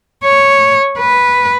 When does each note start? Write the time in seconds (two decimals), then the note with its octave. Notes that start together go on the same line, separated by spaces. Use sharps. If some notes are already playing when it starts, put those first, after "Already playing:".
0.24 C#5
0.98 B4